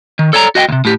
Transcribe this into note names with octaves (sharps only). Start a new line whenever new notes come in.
D#3
A4 C#5 D5 A5 A#5
F#4 D#5 F#5 G5
D2 C3
A2 G4